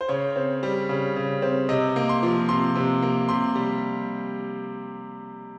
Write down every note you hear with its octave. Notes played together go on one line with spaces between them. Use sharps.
C5
C#3 C#5
C4
G3
C#3
C#3
C4
C3 D#5
A#3
C6
F3
C3 C6
C3
A#3
C3 C6
G3